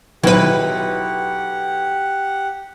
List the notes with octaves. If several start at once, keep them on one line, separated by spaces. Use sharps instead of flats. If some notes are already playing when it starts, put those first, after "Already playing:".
B1 E4 G4 B4 F#5